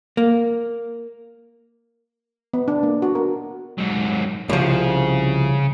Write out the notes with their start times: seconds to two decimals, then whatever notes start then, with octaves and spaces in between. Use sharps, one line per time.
0.17 A#3
2.53 B3
2.68 D4
2.83 A#3
3.02 F#4
3.15 A#4
3.78 G#2 F#3
4.49 C2 C#3 F3